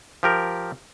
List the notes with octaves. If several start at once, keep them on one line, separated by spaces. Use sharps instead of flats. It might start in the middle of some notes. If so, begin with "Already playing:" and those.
F3 G4 A#4